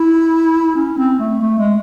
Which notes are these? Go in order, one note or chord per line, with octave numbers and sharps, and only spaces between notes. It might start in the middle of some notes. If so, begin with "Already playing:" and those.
Already playing: E4
C#4
C4
A3
A3
G#3